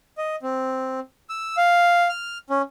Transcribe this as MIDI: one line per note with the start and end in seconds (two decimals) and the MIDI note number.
0.18 0.36 75
0.42 1.00 60
1.29 1.56 88
1.57 2.08 77
2.09 2.38 89
2.50 2.62 61